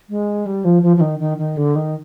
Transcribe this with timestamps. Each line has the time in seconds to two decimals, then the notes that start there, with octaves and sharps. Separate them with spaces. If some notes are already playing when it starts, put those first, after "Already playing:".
0.10 G#3
0.46 G3
0.65 F3
0.83 F3
0.97 F3
1.01 D#3
1.19 D#3
1.38 D#3
1.57 D3
1.75 D#3